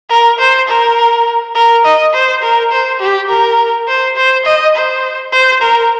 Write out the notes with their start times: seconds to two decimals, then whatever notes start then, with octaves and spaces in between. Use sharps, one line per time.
0.10 A#4
0.39 C5
0.68 A#4
1.55 A#4
1.85 D#5
2.14 C5
2.43 A#4
2.72 C5
3.00 G4
3.29 A#4
3.88 C5
4.17 C5
4.45 D#5
4.75 C5
5.32 C5
5.62 A#4